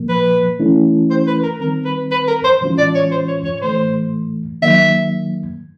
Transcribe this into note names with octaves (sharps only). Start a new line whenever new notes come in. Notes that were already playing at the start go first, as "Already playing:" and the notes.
Already playing: A#2 F3 A#3
B4
E3 A3 C#4 E4
C5
B4
A#4
D#3 G3 C4 A#4
B4
B4
A#4
C5
A2 E3 G#3 C#4 F4
D5
C#5
C5
C#5
C#5
C#5
A2 E3 A3 C5
D#3 F#3 A#3 E5